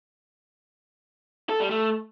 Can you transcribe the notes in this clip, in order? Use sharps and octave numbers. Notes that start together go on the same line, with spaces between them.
A4
G3
A3